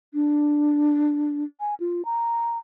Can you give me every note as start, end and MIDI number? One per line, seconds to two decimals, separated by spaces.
0.14 1.44 62
1.60 1.75 80
1.80 2.05 65
2.05 2.58 82